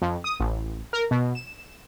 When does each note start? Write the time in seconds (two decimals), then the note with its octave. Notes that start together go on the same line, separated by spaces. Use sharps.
0.02 F2
0.24 D#6
0.40 A1
0.93 A#4
1.11 B2
1.35 E7